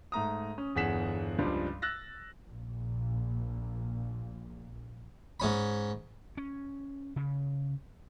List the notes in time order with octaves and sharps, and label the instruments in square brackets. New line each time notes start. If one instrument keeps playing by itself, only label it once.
[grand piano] G#2 A3 A#5 D#6
C#4
G1 E2 G#4 F#5 B6 E7
C#2 G2 F3 G3 G#3
E6 F#6 A6 A#6
[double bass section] A#1 A#2
[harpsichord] G#2 C#4 B5
[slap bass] C#4
C#3